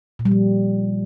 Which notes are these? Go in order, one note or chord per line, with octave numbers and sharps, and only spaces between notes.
A#2
G3
F3